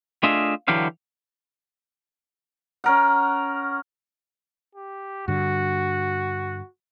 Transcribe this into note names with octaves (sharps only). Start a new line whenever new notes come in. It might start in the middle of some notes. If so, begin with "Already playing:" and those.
A3 D4 F4 G#4 D#5 E5
D3 E3 F#3 G4 F5
C#4 A#4 F#5
G4
G2 D3 F#4